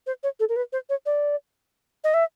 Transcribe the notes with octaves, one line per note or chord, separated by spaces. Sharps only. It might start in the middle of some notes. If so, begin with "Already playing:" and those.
C5
C#5
A4
A#4
B4
C5
C#5
D5
D#5
E5